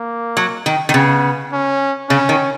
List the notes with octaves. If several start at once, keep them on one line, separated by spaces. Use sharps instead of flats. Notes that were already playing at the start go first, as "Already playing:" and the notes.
Already playing: A#3
F#3
D#3
D#3
C#3 B3
C#4
C#3 C#4
D#3